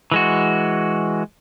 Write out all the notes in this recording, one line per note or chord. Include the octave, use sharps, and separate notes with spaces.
E3 G#3 F#4